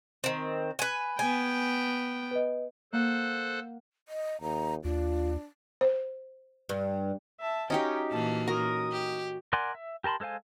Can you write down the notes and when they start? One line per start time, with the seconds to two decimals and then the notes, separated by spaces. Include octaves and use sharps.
0.24 D#3 C4
0.79 B4 G#5
1.19 B3 G5 G#5 G6
2.31 B4 D#5
2.93 A#3 A4 C5 F5 F#5 F#6
4.08 D#5
4.42 D#2 A#5
4.84 D#2 D4 F4
5.81 C5
6.69 G2
7.40 E5 A5
7.70 C#4 D#4 F#4 G4 D#5 F5 G5 A#5
8.11 A#2 E3 A#3 A5
8.48 C#4 F#4 A#4 C#5 G5 D#6
8.92 G4
9.53 A#4 D5 F#5 G#5 C6
9.75 E5
10.04 G4 A#4 A5 B5 C6
10.20 G#3 A4 C5 F5 G#5